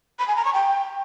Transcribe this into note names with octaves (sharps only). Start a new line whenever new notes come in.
B5
G#5
A#5
C#6
G5